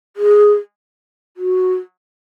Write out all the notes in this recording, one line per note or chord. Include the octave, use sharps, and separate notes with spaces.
G#4
F#4